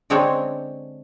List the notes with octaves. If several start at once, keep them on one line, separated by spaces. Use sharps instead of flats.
D3 G#3 C4 D4 A4 C#5